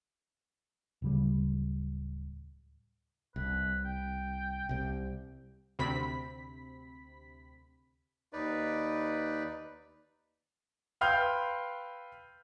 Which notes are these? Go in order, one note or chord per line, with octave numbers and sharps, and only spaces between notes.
D1 C#3 G3
C2 B4
G5
C2 C3
D2 C3 C4 B5 B6
D#2 D#4 B4 D5
B4 F5 G5 C6 F6 G6